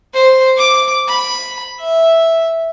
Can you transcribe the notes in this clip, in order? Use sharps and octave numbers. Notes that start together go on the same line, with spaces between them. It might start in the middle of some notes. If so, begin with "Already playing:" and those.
C5
D6
B5
E5